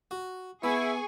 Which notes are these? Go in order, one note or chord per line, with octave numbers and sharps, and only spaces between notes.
F#4
B3 E4 G#4 G#5 C#6